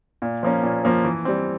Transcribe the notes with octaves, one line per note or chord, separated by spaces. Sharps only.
A#2
F3 A#3 C#4
A#2
F3 A#3 C#4
E3
G3 C4